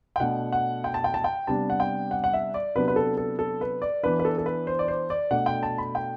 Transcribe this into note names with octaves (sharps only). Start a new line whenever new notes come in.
G5
B2 A3 D4 F#5
F#5
G5
A5
G5
A5
G5
C3 G3 B3 D4 A5
F#5
G5
F#5
F#5
E5
D5
C3 F#3 B3 D4 B4
B4
A4
A4
A4
B4
D5
E3 B3 D4 B4
B4
A4
A4
B4
C5
D5
C5
D5
B2 A3 D4 F#5
G5
A5
B5
G5